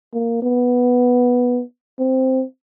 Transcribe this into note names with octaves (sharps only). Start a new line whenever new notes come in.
A#3
B3
C4